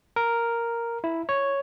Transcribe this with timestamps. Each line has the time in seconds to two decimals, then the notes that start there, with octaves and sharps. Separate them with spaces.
0.16 A#4
1.04 E4
1.29 C#5